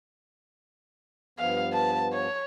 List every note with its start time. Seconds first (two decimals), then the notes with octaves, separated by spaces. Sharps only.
1.39 G2 F3 B3 F5
1.73 A5
2.13 C#5